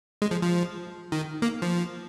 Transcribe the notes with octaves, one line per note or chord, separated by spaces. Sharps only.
G#3
F3
F3
D#3
A#3
F3